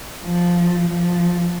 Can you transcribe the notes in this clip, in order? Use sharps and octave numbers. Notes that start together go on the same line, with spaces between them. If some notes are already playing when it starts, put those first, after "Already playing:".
F3
F3